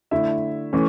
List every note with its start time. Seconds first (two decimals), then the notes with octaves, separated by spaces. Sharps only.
0.11 D3 A3 E4 E5
0.73 E3 A3 C#4